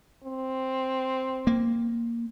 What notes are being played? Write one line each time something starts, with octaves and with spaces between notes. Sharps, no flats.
C4
A#3